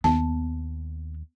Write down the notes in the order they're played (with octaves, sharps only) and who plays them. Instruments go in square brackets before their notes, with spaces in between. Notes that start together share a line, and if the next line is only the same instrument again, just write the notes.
[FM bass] D#2 [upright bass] B3 [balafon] A5